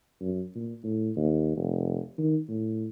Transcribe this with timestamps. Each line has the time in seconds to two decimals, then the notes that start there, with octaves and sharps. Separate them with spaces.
0.21 F#2
0.55 A#2
0.83 A2
1.16 D#2
1.57 F1
2.18 D#3
2.48 A2